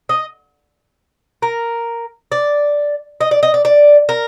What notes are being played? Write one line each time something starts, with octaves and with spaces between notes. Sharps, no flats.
D#5
A#4
D5
D#5
D5
D#5
D5
D5
A#4